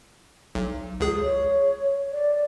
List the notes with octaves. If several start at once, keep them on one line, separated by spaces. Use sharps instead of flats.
B1
C#2 G#4
C#5
D5